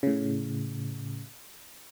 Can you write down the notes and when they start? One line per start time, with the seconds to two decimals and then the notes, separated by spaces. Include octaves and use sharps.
0.03 A2 C#3